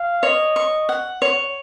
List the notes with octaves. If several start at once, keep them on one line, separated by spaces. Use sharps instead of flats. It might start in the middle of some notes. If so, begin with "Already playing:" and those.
Already playing: F5
C#5 D#5
C#6
F#5
C#5